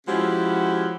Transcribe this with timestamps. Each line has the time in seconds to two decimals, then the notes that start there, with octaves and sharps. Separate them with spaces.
0.07 F3 G#3 C#4 E4 F#4 G4